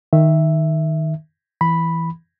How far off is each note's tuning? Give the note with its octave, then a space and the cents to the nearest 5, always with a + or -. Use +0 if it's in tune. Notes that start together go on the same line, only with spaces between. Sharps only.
D#3 +0 E5 +0
E3 +0 B5 +0